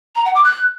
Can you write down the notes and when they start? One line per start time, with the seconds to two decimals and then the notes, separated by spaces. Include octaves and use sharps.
0.16 A#5
0.25 F#5
0.35 D6
0.44 F#6